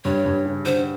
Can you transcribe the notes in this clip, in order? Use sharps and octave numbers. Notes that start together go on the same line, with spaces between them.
G2 C#5
G2
C#3
D3 C5